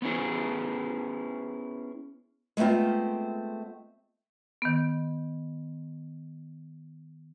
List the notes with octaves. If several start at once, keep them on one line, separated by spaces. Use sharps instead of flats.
B3 C#4 E4 G#4
G#3 A3 B3 C4 F4
D#3 B3